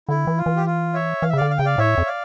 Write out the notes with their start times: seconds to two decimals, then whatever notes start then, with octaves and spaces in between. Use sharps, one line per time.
0.09 D3 E4
0.27 E3
0.38 F4
0.46 E3
0.56 G4
0.66 F4
0.94 C#5 E5
1.22 E3 F5
1.29 E5
1.33 C#3
1.37 D3 D5 F5
1.50 F5
1.58 C#3 G5
1.65 D5 F5
1.78 A2 C#5 E5
1.98 F2
2.06 D5 F5